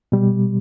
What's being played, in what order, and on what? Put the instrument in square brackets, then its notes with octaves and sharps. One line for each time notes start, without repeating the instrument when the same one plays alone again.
[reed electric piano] B2 G3